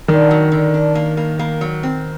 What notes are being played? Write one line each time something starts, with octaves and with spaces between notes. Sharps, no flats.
D#3 D4
F#3
D3
D4
A#3
A#3
A#3
F#3
C4